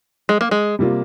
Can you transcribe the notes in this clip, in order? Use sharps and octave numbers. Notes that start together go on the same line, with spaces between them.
G#3
A#3
G#3
C3 G3 A#3 F4